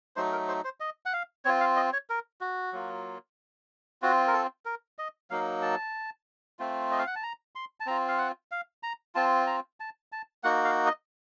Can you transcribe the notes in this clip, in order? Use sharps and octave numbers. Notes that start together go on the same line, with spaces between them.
F#3 A3 D#4 C5
A#4
C5
C5
D#5
F#5
F5
C4 F4 C#5
F5
D#5
C#5
A#4
F#4
F#3 A#3 F4
C4 F4 F#4
A#4
A4
A#4
D#5
F#3 A#3 D#4 F5
A5
A3 C4 F4
D#5
F5
F#5
A5
A#5
C6
A5
C4 F4 A#5
F5
F#5
F5
A#5
C4 F4 A5
A#5
A5
A5
A#3 D#4 F#4 F#5
F5
D#5